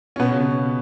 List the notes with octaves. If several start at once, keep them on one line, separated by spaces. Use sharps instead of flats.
C#4
B2 B3
C#3 C#4
C#3 C#4